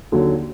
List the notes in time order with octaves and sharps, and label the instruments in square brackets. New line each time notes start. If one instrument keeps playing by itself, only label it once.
[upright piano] D#2 D3 F#3